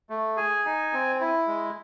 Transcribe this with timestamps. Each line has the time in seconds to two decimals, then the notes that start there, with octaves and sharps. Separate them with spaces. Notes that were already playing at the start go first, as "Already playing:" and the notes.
0.10 A3
0.37 G#4 G#5
0.65 D#4
0.93 C4
1.20 E4
1.47 G#3